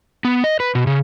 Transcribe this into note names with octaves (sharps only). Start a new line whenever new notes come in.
B3
D#5
B4
B2
C#3